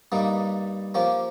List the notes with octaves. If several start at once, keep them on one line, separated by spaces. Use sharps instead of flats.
G2 G3 A#3 D#4
F3 A#3 C#4 G4